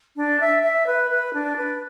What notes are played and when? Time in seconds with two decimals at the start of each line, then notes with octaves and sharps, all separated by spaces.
0.16 D4
0.41 E5
0.63 E5
0.87 B4
1.11 B4
1.34 D4
1.57 B4